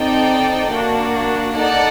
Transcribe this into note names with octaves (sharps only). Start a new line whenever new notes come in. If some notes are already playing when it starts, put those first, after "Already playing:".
Already playing: C4 D#4 A4 D5 G5
A#3 D4 F#4
D#4 A4 D5 F#5